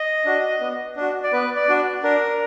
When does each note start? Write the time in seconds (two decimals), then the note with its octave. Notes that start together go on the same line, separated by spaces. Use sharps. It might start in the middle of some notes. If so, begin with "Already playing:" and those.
Already playing: D#5
0.25 D4 F#4
0.61 B3
0.96 D4 F#4
1.23 D5
1.33 B3 B4
1.56 D5
1.68 D4 F#4
2.03 D4 A#4